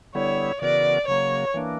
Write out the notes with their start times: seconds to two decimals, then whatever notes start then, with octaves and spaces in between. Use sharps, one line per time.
0.15 D3 G3 B3 E4 C#5
0.62 C#3 E3 B3 F#4 A#4 D5
1.08 C#3 F#3 A#3 C#5
1.54 E3 A#3 D4